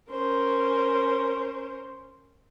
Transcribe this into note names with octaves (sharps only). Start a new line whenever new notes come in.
C#4 A#4 C5